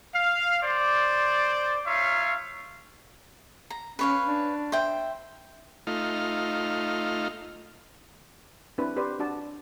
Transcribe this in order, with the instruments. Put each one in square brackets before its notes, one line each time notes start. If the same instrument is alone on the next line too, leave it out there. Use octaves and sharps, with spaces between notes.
[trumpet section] F5
C5 D5
D#4 F4 C#5 E5 F5
[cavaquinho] A#5
[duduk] C#4 [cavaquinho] B4 C#5 F5
[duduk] D4
[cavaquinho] C5 E5 G5
[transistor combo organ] A3 D#4 F4 F6
[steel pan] C4 D4 E4 B4
C4 G4 B4 C5 D5
D4 F#4 D5 A5